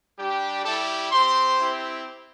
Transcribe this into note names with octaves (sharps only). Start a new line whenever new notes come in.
G3 D4 G4
G3 E4 G4 A4 A5
C4 G4 C5 C6
C4 E4 G4